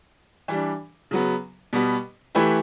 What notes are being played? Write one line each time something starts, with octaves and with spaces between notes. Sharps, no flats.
E3 G3 D4
C#3 F#3 B3
B2 G3 B3
E3 A3 E4 G4 B4